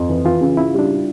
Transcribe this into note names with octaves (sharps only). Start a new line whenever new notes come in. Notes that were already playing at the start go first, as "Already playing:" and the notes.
Already playing: F2
E3
E3 F4
C#3
C#3 E4
G3 D4